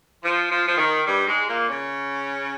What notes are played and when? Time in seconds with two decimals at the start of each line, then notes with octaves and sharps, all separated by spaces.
0.21 F3
0.50 F3
0.67 F3
0.77 D#3
1.05 G2 G3
1.25 G#2 G#3
1.47 A#2 A#3
1.67 C#3 C#4